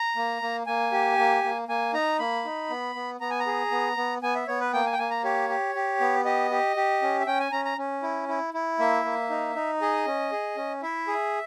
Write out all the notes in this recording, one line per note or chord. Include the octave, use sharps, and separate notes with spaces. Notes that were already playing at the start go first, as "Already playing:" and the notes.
Already playing: A#5
A#3
A#3
A#3 G#5
G4
A#3
A#3
A#3 G#5
D#4 A#5
A#3 B5
D#4
B3
B3
B3 A#5
G#5
A#5
G#4
B3
B3
B3 G#5
E5
B3 C#5
B4
A#3 G5
G#5
G5
A#3 G#5
A#5
G4 C#5
G4
G4
B3
G4 D#5
G4
G4
C#4
E5
C#4 G5
G#5
C#4 A#5
A#5
C#4
E4
E4
E4
A#3 E5
A#3
D#4
D#4
G#4 D#5
C#4
G#4
C#4
E4 E5
G#4